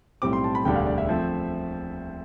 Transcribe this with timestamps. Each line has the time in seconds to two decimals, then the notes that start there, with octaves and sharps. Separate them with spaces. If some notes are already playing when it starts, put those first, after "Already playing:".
0.22 B1 A2 G3 C4 D6
0.33 C6
0.44 A5
0.55 B5
0.65 E1 D2 D3 G3 D4 G5
0.75 F5
0.86 D5
0.98 E5
1.09 F3 A3 C4